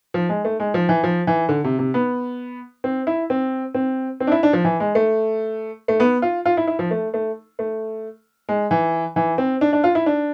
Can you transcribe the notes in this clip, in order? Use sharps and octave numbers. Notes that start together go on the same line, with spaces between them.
F3
G#3
A3
G#3
F3
E3
F3
E3
D3
C3
C3
B3
C4
E4
C4
C4
C4
D4
E4
D4
F3
E3
G#3
A3
A3
B3
F4
F4
E4
E4
F3
A3
A3
A3
G#3
E3
E3
C4
D4
D4
F4
E4
D4